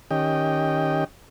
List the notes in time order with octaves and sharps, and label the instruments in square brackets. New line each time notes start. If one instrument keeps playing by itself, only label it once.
[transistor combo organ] D#3 C#4 G4 D#5 G5